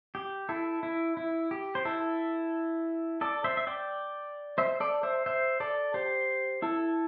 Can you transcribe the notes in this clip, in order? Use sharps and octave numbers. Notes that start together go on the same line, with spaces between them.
G4
E4 A4
E4
E4
G4
C5
E4 A4
A4 D5
C5 E5
E5
D5 G5
C5 E5
A4 D5
C5 E5
C5 E5
A4 D5
G4 C5
E4 A4